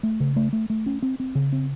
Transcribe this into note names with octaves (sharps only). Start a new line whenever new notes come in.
A3
C#3
A3
A3
A3
C#4
C4
C4
C#3
C4